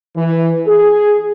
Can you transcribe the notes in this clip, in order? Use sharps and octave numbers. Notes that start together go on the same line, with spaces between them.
E3
G#4